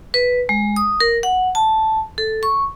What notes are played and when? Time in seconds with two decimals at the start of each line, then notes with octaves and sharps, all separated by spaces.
0.14 B4
0.49 G#3
0.76 D#6
1.00 A#4
1.23 F#5
1.55 A5
2.18 A4
2.43 C#6